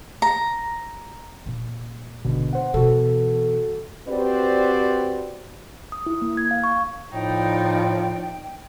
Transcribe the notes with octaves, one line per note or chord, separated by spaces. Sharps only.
A#5
A#2
G#1 B2 D3
C5 F#5
B2 E3 F#4 A4
C4 F#4 G4 B4 C5 D5
D#6
E4
A#3
G#6
F5
C#6
A2 F3 D#4 D5 G5